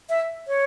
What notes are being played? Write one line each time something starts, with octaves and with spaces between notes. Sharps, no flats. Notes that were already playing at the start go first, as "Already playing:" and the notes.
E5
C#5